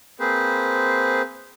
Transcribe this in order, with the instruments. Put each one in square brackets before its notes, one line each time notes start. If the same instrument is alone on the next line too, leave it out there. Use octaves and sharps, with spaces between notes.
[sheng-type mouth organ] A#3 C4 G#4 B4 C5